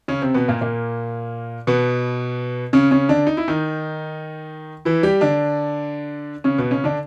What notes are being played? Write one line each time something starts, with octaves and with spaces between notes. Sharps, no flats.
C#3 C#4
C3 C4
B2 B3
A#2 A#3
A#2 A#3
B2 B3
C#3 C#4
C#3 C#4
D3 D4
D#4
E4
D#3 D#4
E3 E4
G3 G4
D3 D4
C#3 C#4
B2 B3
C#3 C#4
D3 D4